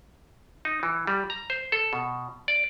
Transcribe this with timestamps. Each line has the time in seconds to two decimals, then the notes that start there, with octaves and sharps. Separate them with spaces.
0.65 D#4
0.83 E3
1.07 G3
1.30 A#5
1.50 C5
1.72 A4
1.93 B2
2.48 D5